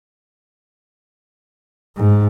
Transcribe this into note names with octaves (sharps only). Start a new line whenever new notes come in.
G#2